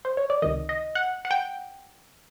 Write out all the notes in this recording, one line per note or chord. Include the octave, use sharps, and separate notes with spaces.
C5
C#5
D5
C#2 C3 D#3 D#5
D#5
F#5
F#5
G5